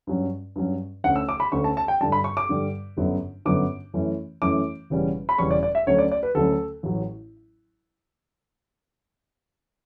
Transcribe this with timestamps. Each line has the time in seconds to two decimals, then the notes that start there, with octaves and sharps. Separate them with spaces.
0.07 G2 F#3 C#4
0.56 G2 F#3 C#4
1.04 D2 D3 A3 C#4 F#5
1.16 E6
1.29 D6
1.40 B5
1.52 D2 D3 A3 C#4 C#6
1.64 A5
1.77 A5
1.88 G5
2.01 G2 D3 G3 A5
2.12 B5
2.24 C#6
2.37 D6
2.49 G2 D3 G3
2.97 G1 F#2 D3 F#3 B3
3.45 G1 F#2 D3 F#3 B3 D6
3.94 F#2 E3 A3 C#4
4.42 F#2 E3 A3 C#4 D6
4.90 E1 E2 C#3 G3 C#4
5.29 B5
5.38 E1 E2 C#3 G3 C#4 C#6
5.51 D5
5.63 D5
5.75 E5
5.87 D2 D3 F#3 A3 C#4 C#5
5.99 D5
6.12 D5
6.23 B4
6.35 D2 D3 F#3 A3 C#4 A4
6.83 A1 A2 F#3